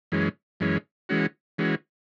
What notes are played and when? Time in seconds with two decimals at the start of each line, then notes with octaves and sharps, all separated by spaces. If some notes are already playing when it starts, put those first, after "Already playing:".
0.12 F#2 E3 G#3 C#4
0.60 F#2 E3 G#3 C#4
1.09 E3 G#3 C#4 F#4
1.58 E3 G#3 C#4 F#4